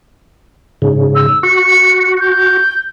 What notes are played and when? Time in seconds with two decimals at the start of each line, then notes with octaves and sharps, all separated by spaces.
0.82 G#2 C#3
1.15 E6
1.43 F#4 C#7
2.20 G6